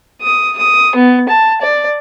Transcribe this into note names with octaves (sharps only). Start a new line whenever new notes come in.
D#6
D#6
B3
A5
D5